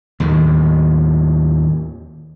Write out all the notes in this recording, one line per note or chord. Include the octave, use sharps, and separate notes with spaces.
D#2 A2 D#3